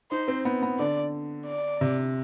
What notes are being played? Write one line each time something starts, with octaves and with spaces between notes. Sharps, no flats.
D#4 C5
C4
B3
B3
D3 D5
D5
C3